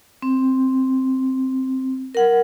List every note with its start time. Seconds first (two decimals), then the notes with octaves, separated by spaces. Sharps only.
0.22 C4
2.15 A#4 F#5